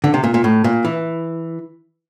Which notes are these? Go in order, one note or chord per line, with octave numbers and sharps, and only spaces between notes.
D3
C3
A#2
A#2
A2
A#2
E3